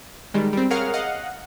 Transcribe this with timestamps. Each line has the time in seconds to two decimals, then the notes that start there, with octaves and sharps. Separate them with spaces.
0.34 D#3 G3 G#3
0.53 G3 C4
0.70 G#4 A#4 C#5 F5 F#5 F6
0.94 D#5 F5 F#5